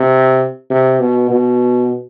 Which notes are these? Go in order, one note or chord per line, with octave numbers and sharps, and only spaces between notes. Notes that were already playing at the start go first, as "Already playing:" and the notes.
Already playing: C3
C3
B2
B2